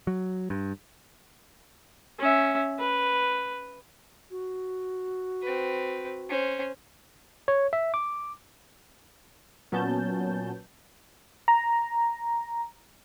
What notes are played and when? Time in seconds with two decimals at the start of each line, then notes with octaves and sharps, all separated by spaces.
0.07 F#3
0.50 G2
2.19 C#4 E5
2.79 B4
4.31 F#4
5.43 C4 B4
6.29 C#4 C5
7.48 C#5
7.73 E5
7.94 D6
9.72 A#2 F#3 B3 C#4 A5 G6
11.48 A#5